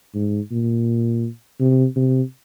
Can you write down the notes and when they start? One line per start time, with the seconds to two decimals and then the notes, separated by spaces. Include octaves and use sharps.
0.15 G#2
0.51 A#2
1.60 C3
1.96 C3